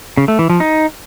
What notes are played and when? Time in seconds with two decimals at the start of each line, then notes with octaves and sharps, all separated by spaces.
0.17 C#3
0.28 A3
0.39 E3
0.50 F3
0.60 D#4